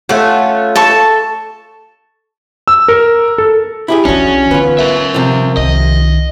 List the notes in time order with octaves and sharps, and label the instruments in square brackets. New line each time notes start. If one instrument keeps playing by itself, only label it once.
[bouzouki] A3 C#4 F4 [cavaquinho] F#5
[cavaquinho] A4 A5 C#6
[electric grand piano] E6
A#4
A4
[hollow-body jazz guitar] E4 G4 G#4
[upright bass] B1 E3 [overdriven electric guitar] C#4 [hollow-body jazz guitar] D4 F#4
[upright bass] D3 D#4 [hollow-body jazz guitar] B3 F4
[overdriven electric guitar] A#4 E5
[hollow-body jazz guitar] C3 F3
[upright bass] C2 D#3 [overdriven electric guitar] D#5